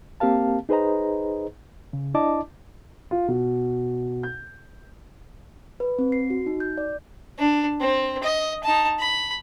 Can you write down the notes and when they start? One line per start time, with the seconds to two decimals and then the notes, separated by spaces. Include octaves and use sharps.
0.20 A#3 C4 G4 A#4 F5 A5
0.69 D#4 G#4 B4 C5 D#5 A#5
1.93 C#3
2.14 D4 E4 D5 D#5 A5 D6
3.11 F4
3.28 B2
4.23 G6
5.80 B4
5.99 C4
6.12 C7
6.30 F#4
6.46 D#4
6.60 G6
6.78 D5
7.38 D4
7.80 C4
8.23 D#5
8.63 D#4 A5
8.99 B5